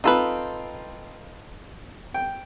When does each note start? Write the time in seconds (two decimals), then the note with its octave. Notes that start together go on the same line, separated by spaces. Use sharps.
0.04 C4 D#4 F4 A4 B4
2.14 G5